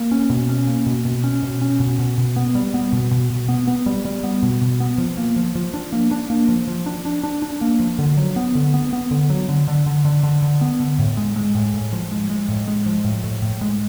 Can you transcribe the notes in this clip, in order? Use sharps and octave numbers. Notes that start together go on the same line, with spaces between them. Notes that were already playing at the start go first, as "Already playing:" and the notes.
Already playing: A#3
C#4
B2
C#4
A#3
B2
B2
C#4
B2
C#4
B2
B2
B2
B3
G3
B3
B2
B2
B2
B3
B3
G3
G3
B3
B2
B2
B3
F3
A#3
F3
F3
D4
A#3
D4
A#3
F3
F3
D4
D4
D4
D4
A#3
F3
D3
F#3
B3
D3
B3
B3
D3
F#3
D3
D3
D3
D3
D3
D3
B3
D3
A2
G#3
G#3
A2
A2
F3
G#3
G#3
A2
G#3
F3
A2
A2
A2
G#3